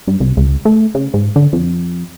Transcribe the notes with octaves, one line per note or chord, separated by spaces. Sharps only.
G2
C2
C#2
A3
C#3
G#2
D3
F2